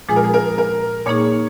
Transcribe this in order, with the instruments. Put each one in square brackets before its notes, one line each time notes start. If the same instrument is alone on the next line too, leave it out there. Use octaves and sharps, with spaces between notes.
[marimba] A#2 F3 G#3 F4 [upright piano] G#4
[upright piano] A#4
G#4
A#4
A#4
[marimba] A#2 A#3 D#4 G#4 [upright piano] C#5